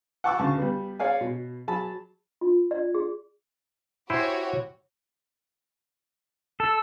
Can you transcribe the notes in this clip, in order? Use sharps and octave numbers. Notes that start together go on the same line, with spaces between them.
F#5 G5 A5 C#6 D6 E6
D2 C#3 A5 C#6
G3 B3
G#4 C#5 D5 F5 G#5
B2
F#3 G#4 A5 B5
F4
D5
G#4
E4 F#4 G4 C5 C#5 G#5
A4 E6